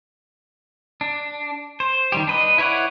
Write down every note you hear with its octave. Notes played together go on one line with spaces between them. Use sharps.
D4
C5
D#3 G3 G4
D4 B4 D#5
E4 B4 C#5 D5 F#5